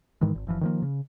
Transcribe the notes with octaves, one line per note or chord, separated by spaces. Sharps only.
G#2 D#3 E3 G#3
G#1
F#1 E3 F3
D#3 F3 A#3
C#3